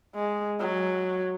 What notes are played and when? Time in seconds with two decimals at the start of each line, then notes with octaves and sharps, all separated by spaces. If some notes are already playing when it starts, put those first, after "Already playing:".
0.15 G#3
0.60 F#3